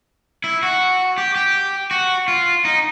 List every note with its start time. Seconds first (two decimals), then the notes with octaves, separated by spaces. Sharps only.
0.44 E4
0.63 F#4
1.18 G4
1.36 G4
1.91 F#4
2.28 F4
2.65 D#4